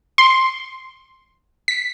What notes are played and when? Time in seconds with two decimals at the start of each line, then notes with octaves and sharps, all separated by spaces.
0.18 C6
1.68 B6